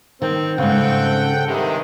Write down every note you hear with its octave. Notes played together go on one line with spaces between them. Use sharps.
D#3 C4
G#2 C#3 C4 A4 F#5 G5
G2 C3 D#3 G#3